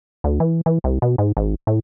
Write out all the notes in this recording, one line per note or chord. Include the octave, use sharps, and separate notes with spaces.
D2
E3
E3
C2
B2
G#2
G#1
A2